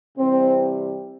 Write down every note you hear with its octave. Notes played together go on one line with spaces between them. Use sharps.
C3 E3 G3 C4